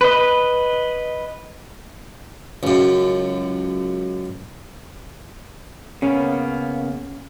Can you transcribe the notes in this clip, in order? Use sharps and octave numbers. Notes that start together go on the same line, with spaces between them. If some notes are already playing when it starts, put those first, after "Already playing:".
B4 D#5
C#2 F#2
C#3 A#3 B3 C#4